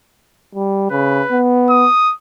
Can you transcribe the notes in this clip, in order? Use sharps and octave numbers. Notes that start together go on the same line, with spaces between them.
G3
C#3 B4
B3
D#6